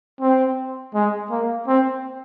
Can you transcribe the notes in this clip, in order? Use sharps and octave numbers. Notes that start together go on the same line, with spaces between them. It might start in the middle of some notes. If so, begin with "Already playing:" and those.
C4
G#3
A#3
C4